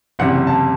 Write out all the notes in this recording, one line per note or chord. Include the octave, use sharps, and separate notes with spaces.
F#1 E2 C3 F#5
A5